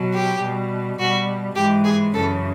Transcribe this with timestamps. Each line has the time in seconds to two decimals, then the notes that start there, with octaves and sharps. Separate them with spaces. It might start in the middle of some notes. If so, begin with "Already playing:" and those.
Already playing: B2 F#3
0.14 G4
0.41 B2 G3
0.98 B2 G3 F#4
1.56 G#2 E3 G#3 G4
1.85 G#4
2.14 F#2 C#3 E3 A4